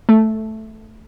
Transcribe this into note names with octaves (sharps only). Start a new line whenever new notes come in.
A3